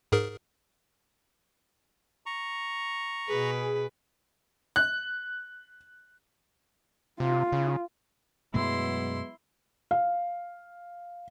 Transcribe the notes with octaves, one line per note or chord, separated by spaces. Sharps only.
G#2 G#4 A#4
A#5 C#6
B2 G#4 B4
F#6
C3 F4
C#3
F#2 B2 F#3 G#3 A3 B3 E4 C6
F5